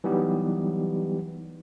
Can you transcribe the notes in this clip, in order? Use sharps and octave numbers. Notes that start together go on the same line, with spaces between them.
E3 F#3 G3 B3 D#4 G4